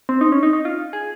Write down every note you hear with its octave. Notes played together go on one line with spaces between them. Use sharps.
C4
D#4
C#4
D#4
D#4
F4
G#4